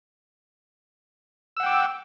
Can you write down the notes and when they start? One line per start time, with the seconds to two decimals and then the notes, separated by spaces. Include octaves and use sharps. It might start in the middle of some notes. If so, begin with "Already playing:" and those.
1.57 E6
1.60 F#5
1.63 G5
1.66 D6